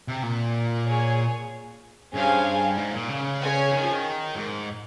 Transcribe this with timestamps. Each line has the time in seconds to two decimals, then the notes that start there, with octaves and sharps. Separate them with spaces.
0.08 C3
0.23 A#2
0.87 G#4 C#5 G#5
2.14 G2 C#4 G#4 C5 F5 G#5
2.77 G#2
2.93 A#2
3.09 C#3
3.41 C#4 G#4 C#5 G#5
3.72 D#3
3.83 F3
3.93 D#3
4.36 G#2